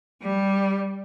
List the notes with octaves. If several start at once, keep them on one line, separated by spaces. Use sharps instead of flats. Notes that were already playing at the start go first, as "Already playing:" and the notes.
G3